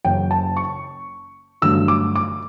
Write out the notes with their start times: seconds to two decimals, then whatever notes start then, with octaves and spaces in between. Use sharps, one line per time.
0.04 F#1 F#2 C#3 G5
0.31 A5
0.57 C#6
1.62 G2 D3 F#3 A3 E6
1.88 D6
2.16 D6